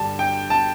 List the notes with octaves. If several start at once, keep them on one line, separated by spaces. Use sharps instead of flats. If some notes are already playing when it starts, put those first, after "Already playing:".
Already playing: G2 D3 G3 A5
G5
A5